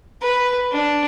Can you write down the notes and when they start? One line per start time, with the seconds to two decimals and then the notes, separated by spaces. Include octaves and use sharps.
0.22 B4
0.72 D4